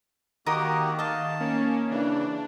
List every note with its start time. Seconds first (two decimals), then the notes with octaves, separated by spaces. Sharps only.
0.46 D#3 A#3 D#4 F#4 G4 A#4 D#6
0.99 D#5 F5 A5
1.40 A#3 C#4
1.91 C#3 E3 D4